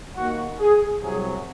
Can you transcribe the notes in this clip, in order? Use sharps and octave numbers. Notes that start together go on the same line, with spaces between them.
D#2 D#3 A#3 F#4
G#4
C2 C3 F#3 G#4